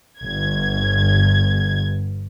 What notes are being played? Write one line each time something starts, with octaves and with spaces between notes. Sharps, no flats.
G1 G#6